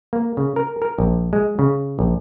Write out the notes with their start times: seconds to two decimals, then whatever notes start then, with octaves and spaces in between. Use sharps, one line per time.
0.13 A#3
0.37 C#3
0.56 A#4
0.82 A#4
0.98 A#1
1.33 G#3
1.59 C#3
1.99 A#1